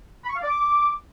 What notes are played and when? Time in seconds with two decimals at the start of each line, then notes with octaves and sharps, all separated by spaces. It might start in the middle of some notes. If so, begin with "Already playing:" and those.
0.23 B5
0.29 C#6
0.36 F5
0.42 D5
0.48 D6